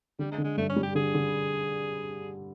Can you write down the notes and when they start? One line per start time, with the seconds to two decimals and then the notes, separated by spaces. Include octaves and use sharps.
0.19 D3 G3
0.32 G#3
0.38 D3
0.44 G#3
0.57 G2 A3
0.69 C#4
0.76 G3
0.83 G4
0.95 D3 G#4
1.15 D3